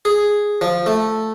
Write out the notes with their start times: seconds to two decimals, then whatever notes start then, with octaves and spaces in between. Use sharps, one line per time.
0.05 G#4
0.61 F3
0.86 A3